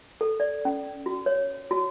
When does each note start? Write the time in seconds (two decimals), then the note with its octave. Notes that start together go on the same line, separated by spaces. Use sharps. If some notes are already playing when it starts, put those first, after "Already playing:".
0.21 A4
0.40 D5
0.65 C#4
1.06 F#4
1.26 C#5
1.71 F#4